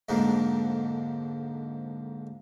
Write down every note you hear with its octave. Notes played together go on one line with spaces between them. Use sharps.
F2 G#2 D3 A#3